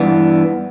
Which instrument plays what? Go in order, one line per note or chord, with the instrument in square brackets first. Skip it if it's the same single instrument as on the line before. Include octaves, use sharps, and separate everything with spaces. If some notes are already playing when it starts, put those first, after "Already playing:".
Already playing: [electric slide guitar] G2 E3 B3 D4